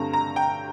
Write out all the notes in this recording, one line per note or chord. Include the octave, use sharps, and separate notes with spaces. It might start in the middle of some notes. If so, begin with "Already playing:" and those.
Already playing: G2 D3 A3 C4 A#5
A#5
G5